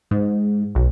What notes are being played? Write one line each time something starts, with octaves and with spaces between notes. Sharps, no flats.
G#2
B1